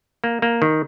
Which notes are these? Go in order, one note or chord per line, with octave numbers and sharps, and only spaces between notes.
A#3
A#3
D#3